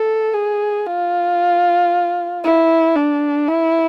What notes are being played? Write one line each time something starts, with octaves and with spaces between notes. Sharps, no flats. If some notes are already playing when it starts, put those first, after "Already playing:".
Already playing: A4
G#4
F4
E4
D4
E4